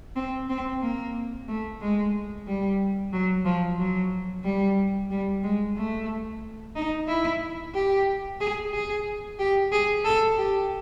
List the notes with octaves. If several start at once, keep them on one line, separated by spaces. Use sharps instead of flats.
C4
C4
A#3
A3
G#3
G3
F#3
F3
F#3
G3
G3
G#3
A3
D#4
E4
G4
G#4
G#4
G4
G#4
A4
G4